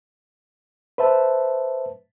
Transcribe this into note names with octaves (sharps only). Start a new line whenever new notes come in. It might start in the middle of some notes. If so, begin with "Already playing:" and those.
B4 C5 E5 A5